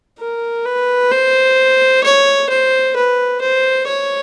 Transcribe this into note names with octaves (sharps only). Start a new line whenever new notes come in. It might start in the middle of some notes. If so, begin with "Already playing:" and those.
A#4
B4
C5
C#5
C5
B4
C5
C#5